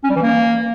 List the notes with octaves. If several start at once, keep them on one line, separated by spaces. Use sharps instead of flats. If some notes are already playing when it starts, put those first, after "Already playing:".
C#4
G3
E3
A#3